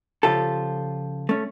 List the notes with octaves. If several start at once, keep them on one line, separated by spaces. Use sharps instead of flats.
C#3 F3 F4 G4 A4
A3 C#4